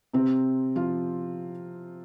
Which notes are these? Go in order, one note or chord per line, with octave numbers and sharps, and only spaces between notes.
C3 C4
F3 F4